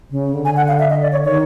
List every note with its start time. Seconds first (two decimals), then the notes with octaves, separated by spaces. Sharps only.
0.11 C#3
0.34 D3
0.45 G#5
0.56 F#5
0.68 F5
0.79 E5
0.90 D#5
1.02 D5
1.12 C#5
1.24 D#3 C#5